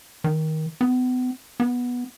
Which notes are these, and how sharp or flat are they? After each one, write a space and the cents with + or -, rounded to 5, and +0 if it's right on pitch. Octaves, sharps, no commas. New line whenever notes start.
D#3 +15
B3 +35
B3 -10